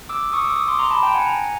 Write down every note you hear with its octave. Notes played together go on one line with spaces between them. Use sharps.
D6 E6
C#6 D#6
D6 E6
C#6 D#6
C6 D6
A#5 C6
A5 B5
G5 A5
F#5 G#5
G#5 A#5